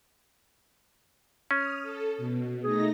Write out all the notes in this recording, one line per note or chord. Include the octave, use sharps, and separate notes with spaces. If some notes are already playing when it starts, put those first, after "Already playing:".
C#4 D#6 F6
A4
B2
A3 D#4 G#4 A#6